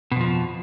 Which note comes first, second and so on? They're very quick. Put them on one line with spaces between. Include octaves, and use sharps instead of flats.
B2 F2 F3